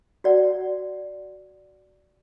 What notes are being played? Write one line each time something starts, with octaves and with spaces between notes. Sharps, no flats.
F#4 D5 F#5